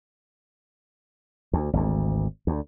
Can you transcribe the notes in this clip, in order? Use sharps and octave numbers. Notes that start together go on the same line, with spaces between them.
D2
G#1 D2
D2